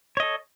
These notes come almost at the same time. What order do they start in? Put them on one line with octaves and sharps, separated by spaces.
C#5 D#5 A4